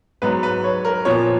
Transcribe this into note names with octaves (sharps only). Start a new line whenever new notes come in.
G#2 F#3 B3 B4
B4
C#5
A#4
A#2 F3 B3 C#5